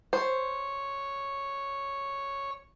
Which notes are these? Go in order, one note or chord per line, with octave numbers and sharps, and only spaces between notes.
C5 C#5